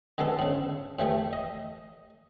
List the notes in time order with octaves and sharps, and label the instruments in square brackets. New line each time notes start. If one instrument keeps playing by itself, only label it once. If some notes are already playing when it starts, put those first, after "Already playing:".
[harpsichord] D3 G#3 B3 A4
G#2 C#3
A2 E3 G3 A3
D#5